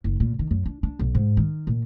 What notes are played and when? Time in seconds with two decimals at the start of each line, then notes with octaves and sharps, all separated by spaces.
0.04 F#1
0.20 A#2
0.39 D#3
0.51 F#2
0.66 D4
0.83 D4
0.99 B1
1.15 G#2
1.37 D#3
1.67 A#2